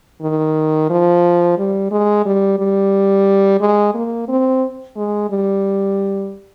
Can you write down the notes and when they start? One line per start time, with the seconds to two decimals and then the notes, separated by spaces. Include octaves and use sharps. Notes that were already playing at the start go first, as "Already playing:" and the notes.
0.22 D#3
0.90 F3
1.58 G3
1.91 G#3
2.26 G3
2.59 G3
3.61 G#3
3.95 A#3
4.29 C4
4.96 G#3
5.30 G3